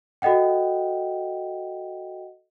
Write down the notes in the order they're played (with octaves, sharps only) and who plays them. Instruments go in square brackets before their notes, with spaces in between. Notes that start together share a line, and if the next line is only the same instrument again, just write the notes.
[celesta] F#4 A4 D#5 F#5 G5